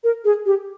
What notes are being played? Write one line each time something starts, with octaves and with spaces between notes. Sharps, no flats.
A#4
G#4
G4